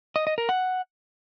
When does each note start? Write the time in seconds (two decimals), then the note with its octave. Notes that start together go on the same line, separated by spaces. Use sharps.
0.16 D#5
0.27 D#5
0.38 A#4
0.49 F#5